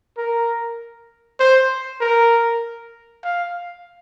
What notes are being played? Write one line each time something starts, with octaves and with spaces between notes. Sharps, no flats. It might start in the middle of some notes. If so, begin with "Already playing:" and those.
A#4
C5
A#4
F5